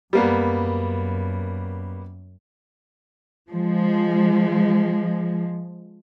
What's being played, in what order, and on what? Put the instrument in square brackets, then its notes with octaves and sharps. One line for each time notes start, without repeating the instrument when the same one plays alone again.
[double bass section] F#2 [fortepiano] G3 A#3 B3
[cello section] F3 G#3